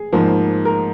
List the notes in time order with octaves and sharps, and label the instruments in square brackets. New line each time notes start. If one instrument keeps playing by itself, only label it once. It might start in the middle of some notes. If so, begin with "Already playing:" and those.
Already playing: [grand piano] G#4
G#2 F3 A#3
A#4